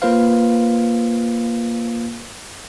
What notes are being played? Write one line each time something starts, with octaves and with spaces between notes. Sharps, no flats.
A#3 F4 B4 C5 F5